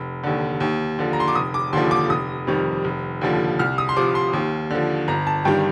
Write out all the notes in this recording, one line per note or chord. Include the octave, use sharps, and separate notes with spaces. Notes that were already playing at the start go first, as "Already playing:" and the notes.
Already playing: F1
D#2 D3
D#2
D3 F3
A#5
C6
D6
F1 D#6
D6
D#2 D3 F3 C6
D6
F1 D#6
F2 D#3 G3
F1
D#2 D3 F3
C2 F6
D#6
C6
C3 F3 D6
C6
D#2
D3 F3
G1 A#5
A5
G2 D#3 G3 G5